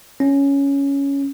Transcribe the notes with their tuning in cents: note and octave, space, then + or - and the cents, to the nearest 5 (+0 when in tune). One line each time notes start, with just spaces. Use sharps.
C#4 +5